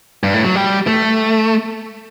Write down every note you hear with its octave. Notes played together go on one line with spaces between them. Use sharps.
G2
A2
F#3
G3
A3